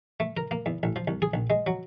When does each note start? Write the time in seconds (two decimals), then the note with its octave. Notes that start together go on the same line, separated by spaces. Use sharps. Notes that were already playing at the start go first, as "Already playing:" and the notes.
0.20 A3
0.37 A#4
0.51 A#3
0.66 E2
0.83 A1
0.96 F3
1.08 C2
1.22 G#4
1.34 A#1
1.50 G#3
1.67 F#3